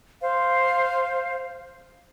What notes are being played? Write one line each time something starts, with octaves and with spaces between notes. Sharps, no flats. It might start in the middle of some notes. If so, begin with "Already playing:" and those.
C5 F5